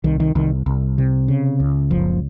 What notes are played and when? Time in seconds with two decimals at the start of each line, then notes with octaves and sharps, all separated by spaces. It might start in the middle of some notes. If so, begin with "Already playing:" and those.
0.04 C2 D#3
0.20 D#3
0.35 C2 D#3
0.66 C2
0.98 C3
1.28 C#3
1.60 C#2
1.91 F#1 F3